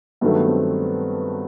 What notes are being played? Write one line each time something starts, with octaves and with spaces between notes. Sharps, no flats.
G2 D#3 F#3 A3 B3
B3
C4